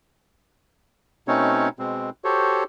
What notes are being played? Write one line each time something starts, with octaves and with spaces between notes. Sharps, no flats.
B2 A3 C4 C#4 D#4 C#5
B2 G#3 C4
F#4 G4 A4 C5 C#5